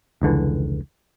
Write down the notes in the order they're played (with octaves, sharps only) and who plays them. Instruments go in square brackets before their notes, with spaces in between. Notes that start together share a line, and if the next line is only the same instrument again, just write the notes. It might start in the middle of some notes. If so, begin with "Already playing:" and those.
[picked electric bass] F1 C#2 D3 E3